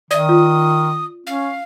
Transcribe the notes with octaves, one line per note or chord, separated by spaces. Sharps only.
D#3 D5 E5 D#6
F4
C#4 F5